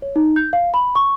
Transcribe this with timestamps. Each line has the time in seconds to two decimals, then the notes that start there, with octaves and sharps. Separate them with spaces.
0.02 C#5
0.16 D#4
0.36 G6
0.53 F5
0.74 B5
0.95 C#6